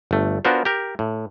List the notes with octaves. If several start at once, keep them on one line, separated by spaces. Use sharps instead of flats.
G1 A3
B3 D4 F4 F#4 A#4 C5
G4 A#4
A2